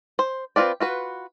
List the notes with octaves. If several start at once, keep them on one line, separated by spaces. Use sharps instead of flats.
C5
C4 D#4 F4 B4 D5
F4 F#4 B4